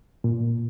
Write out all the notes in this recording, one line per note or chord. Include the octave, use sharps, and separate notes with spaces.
A#2